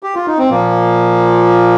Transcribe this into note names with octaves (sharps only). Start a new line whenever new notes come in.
G4
F4
D#4
C4
A#2 F3 A#3